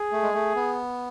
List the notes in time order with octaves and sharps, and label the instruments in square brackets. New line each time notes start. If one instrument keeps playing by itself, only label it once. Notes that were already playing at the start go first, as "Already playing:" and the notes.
Already playing: [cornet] G#4
[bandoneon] A3
G#3
A3
B3